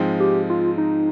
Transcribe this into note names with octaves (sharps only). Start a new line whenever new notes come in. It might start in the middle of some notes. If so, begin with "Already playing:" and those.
Already playing: G#2 F3 G#3 C4
G4
F4
D#4